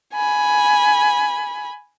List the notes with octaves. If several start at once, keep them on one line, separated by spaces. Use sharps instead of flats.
G#5 B5